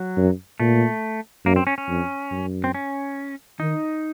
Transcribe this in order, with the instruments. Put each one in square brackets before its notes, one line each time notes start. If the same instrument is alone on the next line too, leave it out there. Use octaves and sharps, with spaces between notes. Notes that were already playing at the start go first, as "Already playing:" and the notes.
Already playing: [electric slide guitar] F#3
[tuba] F#2
[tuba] A#2 [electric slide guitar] A3
[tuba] F#2 [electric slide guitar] A#3
[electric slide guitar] C4
C#4
C#4
[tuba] F2
F#2
[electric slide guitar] C4
C#4
[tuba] D#3 [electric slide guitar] D#4